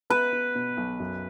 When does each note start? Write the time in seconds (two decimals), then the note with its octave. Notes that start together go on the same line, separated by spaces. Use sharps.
0.10 B3 B4
0.33 B3
0.55 B2
0.77 B1
1.00 F#2